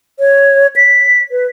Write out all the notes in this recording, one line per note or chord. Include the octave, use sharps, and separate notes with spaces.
C#5
B6
B4